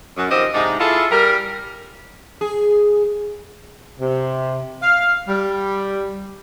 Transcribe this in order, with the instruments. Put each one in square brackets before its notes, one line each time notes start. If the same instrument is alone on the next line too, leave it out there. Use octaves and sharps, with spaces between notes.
[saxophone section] F#2
D#3 F3 C4 G4 D#5
G#2 C3 D4 D#4
E4 F4 G#4 A4
G3 A#4
[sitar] G#4
[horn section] C3
F5
G3